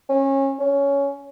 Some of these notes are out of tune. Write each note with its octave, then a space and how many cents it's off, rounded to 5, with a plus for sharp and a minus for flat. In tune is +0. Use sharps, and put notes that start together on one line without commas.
C#4 -25
C#4 +10